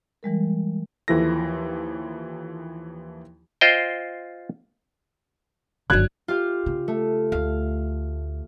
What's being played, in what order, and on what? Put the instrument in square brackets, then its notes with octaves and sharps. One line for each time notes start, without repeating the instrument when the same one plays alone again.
[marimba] E3 G3 G#3 A#4
[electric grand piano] D#2 E3 F3 E4 A4 A#6
[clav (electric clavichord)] F4 C5 D#5 G5
[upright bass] G1 D3 [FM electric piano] D#3 F#3 D4 [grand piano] F#6 G#6
[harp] F4 G4 F5
[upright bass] C#3
[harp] A3
[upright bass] D2 [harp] F5